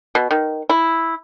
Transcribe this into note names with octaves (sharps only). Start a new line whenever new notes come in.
B2
D#3
E4